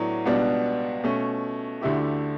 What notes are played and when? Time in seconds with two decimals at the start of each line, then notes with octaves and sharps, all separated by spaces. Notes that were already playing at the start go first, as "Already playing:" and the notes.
Already playing: A2 F#3 B3 D4
0.26 C#2 B2 G3 B3 D4
1.03 B2 A3 C#4
1.81 D2 D3 A3 E4 G4